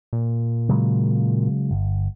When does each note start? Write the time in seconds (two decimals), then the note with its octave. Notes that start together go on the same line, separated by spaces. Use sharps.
0.13 A#2
0.69 C#3 F#3 G#3
1.71 G1